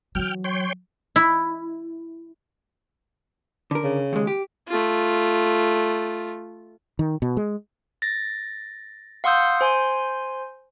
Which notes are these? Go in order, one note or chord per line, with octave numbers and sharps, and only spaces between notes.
E3 F#3 G5 F6
C#5 G5 C6
E4
D3 A#4
C#3
D#2 G#3
G4
A3 F4
D#3
B2
G#3
A6 A#6
F5 F#5 C6 D#6 E6 G6
C5 G#5 C6